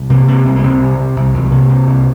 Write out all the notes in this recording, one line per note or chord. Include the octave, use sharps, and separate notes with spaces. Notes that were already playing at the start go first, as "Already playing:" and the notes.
Already playing: C2
C3 A#3
C3 A#3
C2 C4
A#3
C2 C4
C3
C3
C2
C2 F3
G3
C3 A#3
C3
C2